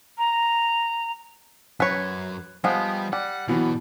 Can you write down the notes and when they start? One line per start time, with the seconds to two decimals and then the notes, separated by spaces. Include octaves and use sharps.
0.18 A#5
1.80 F#2 B4 C#5
2.64 F3 G3 G#3 B3 G5
3.13 G3 F#5
3.48 B2 E3 F#3 B3